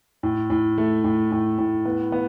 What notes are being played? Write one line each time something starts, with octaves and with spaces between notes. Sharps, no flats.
A2
A2
A3
A2
A2
A2
B3
B3